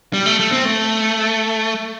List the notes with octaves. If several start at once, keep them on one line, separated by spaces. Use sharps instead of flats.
G3
A3
A3
C4
A3